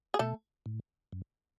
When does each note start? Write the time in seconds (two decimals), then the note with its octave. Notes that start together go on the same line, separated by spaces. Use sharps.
0.14 G#4
0.19 B2 A3 A4
0.66 A2
1.12 F#2